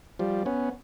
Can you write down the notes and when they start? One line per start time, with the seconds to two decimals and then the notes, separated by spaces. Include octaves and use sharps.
0.19 F3 G3
0.46 B3 C#4